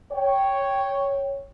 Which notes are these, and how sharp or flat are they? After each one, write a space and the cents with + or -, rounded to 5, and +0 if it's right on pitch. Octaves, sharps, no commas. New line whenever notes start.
C#5 +0 G5 +0